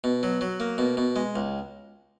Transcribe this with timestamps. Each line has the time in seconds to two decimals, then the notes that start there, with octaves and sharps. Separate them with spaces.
0.04 B2
0.23 F#3
0.41 F#3
0.60 A#3
0.78 B2
0.97 B2
1.16 G#3
1.36 C#2